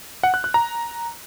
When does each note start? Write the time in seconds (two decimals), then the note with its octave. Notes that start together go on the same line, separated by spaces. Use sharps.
0.23 F#5
0.34 F#6
0.44 F#6
0.54 A#5